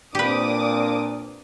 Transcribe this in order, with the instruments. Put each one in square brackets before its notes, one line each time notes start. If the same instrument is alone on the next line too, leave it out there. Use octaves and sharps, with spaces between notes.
[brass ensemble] A#2 [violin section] C4 D6 D#6 [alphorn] D4 [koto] G4 B4